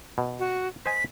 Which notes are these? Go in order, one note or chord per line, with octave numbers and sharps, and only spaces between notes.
B2
F#4
C5 D#5 G#5 B6